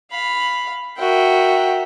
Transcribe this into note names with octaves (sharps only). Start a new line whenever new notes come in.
F5 B5
F#4 A#4 E5 G5